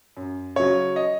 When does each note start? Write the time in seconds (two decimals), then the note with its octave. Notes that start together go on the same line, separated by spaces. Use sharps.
0.17 F#2
0.56 C#3 F#3 C#5
0.96 D#5